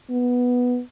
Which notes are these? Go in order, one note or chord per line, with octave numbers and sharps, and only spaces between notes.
B3